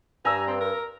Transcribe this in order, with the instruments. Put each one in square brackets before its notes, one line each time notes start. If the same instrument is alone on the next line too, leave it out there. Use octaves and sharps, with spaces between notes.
[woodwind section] G2 [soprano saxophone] G#5 [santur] A#5 E6
[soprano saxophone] C4
A#4